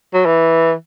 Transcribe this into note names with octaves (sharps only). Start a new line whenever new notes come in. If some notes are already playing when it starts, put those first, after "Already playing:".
F#3
E3